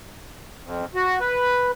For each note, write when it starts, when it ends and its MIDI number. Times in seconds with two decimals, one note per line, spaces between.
0.63 0.85 41
0.95 1.19 66
1.20 1.71 71